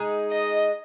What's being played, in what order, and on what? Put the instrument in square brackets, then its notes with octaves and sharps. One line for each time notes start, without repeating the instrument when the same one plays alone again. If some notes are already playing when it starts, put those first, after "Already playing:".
Already playing: [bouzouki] G#3 D#4 G#4
[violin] D#5